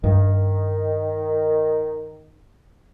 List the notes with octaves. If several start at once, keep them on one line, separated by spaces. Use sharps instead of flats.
G2 D#3